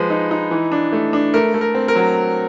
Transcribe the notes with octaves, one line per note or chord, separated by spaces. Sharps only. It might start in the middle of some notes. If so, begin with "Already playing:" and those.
Already playing: F3 G#3 B4
D#4
D#4
E3
D4
A3
D4
A3 A#4
A3
A#4
C4
A#4
F#3